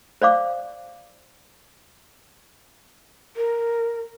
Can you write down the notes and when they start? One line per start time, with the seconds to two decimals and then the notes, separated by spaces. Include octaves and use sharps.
0.22 C5 D5 F5 D6
3.36 A#4